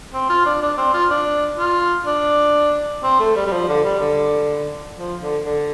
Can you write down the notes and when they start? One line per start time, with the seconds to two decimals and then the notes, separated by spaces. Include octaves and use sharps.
0.14 C4
0.30 F4
0.46 D4
0.62 D4
0.78 C4
0.94 F4
1.10 D4
1.59 F4
2.07 D4
3.03 C4
3.20 A3
3.36 G3
3.46 G3
3.52 F3
3.68 D3
3.84 G3
4.00 D3
4.97 F3
5.21 D3
5.45 D3